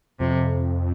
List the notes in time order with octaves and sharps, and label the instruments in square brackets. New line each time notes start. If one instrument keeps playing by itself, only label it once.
[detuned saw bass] F2 [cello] C3